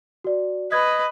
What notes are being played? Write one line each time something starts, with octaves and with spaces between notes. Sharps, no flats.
F#4 D5
B4 D#5 G#6